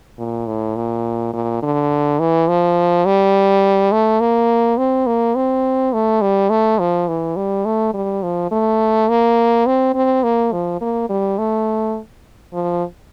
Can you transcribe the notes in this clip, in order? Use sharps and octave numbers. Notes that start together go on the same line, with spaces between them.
A#2
A2
A#2
A#2
D3
E3
F3
G3
A3
A#3
C4
A#3
C4
A3
G3
A3
F3
E3
G3
A3
G3
F3
A3
A#3
C4
C4
A#3
F3
A#3
G3
A3
F3